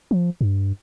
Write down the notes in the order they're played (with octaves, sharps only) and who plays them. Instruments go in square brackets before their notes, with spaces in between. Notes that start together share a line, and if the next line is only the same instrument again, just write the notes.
[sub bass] F3
G2